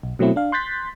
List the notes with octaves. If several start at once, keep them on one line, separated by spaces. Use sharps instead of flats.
B1
B2 F#3 A3 C4 E4
D4 F5
C6 F#6 G6 A6 B6